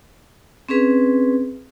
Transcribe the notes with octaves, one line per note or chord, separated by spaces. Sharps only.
C4 C#4 G#4 B4